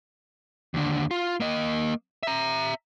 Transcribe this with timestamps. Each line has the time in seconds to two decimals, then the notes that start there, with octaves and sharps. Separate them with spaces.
0.74 D#2 D3
1.11 F4
1.40 A#3 D#5
2.23 E5 A#5